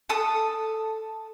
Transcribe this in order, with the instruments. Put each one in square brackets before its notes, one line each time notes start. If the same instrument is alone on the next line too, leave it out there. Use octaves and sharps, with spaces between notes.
[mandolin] A4 A5 D#6